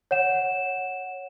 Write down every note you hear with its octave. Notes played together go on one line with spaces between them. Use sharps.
C#5 F#5 E7